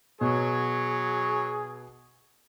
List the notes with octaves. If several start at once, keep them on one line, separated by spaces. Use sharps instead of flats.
B2 F#3 G#4 C#5